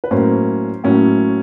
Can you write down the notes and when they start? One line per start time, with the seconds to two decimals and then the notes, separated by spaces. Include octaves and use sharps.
0.04 B4
0.11 A2 F#3 A#3 C#4 C5
0.84 A2 F#3 A#3 C#4